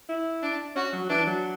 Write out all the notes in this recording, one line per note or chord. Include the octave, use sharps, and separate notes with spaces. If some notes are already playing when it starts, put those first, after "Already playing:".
E4
D4
C#4 F#4
F#3
E3 D4
F#3